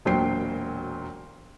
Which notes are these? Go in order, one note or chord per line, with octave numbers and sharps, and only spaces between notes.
E1 A#2 F#3 C5 G5 C7